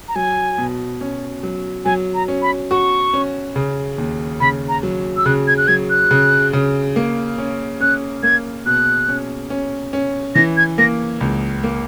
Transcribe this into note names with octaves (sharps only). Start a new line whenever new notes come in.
A#5
F#3 G#5
B2
C#4
F#3
F#3 G#5
A#5
C#4
B5
F#4 C#6
C#4
C#3
D#2
C#3 B5
A#5
F#3
E6
C#3 F#6
G#6
F#6
F#3 G#6
F#6
C#3
C#3
A#3
C#4
C#4 F#6
A#3 G#6
B2 F#6
C#4
C#4
C#4
E3 A#6
G#6
A#3 A#6
C#2
A#3